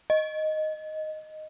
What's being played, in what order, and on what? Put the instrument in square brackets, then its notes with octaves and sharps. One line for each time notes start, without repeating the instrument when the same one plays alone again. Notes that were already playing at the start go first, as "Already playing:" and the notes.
[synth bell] D#5